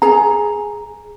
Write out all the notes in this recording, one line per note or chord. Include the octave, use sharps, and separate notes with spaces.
G#4 A#5